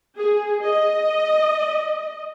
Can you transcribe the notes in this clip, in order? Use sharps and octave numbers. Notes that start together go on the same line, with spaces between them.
G#4
D#5